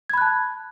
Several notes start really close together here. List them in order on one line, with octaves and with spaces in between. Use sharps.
G#6 B5 F#6 A5